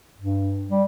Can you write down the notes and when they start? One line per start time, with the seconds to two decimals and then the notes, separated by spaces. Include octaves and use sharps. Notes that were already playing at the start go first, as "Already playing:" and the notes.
0.18 G2
0.70 G3